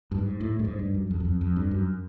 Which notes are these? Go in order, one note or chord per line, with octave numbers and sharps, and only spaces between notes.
G2
G#2
A2
G2
G#2
G2
F#2
F2
F#2
F2
F2
G2
F#2